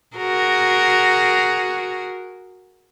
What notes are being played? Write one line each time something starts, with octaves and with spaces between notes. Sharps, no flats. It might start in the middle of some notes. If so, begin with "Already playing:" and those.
F#4 G#4 A#4